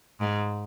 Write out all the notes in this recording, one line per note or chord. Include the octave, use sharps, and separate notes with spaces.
G#2